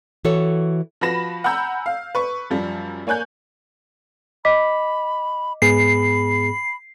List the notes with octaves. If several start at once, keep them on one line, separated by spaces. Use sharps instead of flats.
E3 F#4 A4 C#5
F3 F#4 B4 B5 A#6 E7
F#5 G#5 A#5 B5 E6 G6
F5
B4 C#6
F#2 F3 G3
A#3 C#5 G#5 F#6 G6
D#5 B5 D6 B6
G#2 B3 G#4 B5 C7